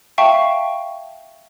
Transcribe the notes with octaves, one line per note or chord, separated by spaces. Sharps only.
E5 F5 G5 A5 C#6